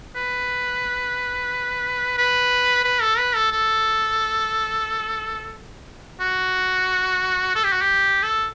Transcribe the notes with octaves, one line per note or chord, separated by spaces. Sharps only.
B4
B4
B4
A4
B4
A4
A4
F#4
A4
G4
F#4
G4
A4